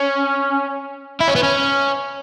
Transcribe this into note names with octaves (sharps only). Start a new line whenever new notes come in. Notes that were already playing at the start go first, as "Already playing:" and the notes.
Already playing: C#4
E4
C#4
B3
C#4